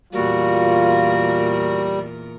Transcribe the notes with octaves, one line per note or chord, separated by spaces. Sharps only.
E2 A#2 G3 F4 F#4 A#4